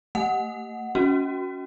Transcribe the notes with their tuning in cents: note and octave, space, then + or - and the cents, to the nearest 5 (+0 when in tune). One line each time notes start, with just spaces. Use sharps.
A3 +45 F#5 +0
C#4 +15 F#4 +0